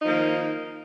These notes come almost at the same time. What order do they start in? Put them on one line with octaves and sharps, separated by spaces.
D#4 F3 A#3 D#3